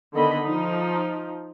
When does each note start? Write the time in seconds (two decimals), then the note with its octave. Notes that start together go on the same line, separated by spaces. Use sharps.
0.15 D3 D#3 B3 D#5 B5
0.43 F3 D#4